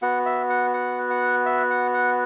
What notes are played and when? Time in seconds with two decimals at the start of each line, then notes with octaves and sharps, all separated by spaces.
0.02 B3 F#4 F#5
0.26 E5
0.50 F#5
0.74 F#5
1.10 F#5
1.46 E5
1.70 F#5
1.94 F#5